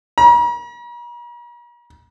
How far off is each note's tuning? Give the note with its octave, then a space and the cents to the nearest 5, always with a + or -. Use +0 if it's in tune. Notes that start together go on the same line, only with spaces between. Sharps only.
A#5 +45